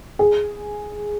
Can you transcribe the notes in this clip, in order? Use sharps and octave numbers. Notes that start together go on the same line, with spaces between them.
G#4